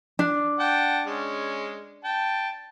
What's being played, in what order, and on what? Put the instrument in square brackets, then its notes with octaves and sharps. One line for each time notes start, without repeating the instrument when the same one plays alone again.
[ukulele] D4
[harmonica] F#5 G5 A5
G#3 C#4
G5 A5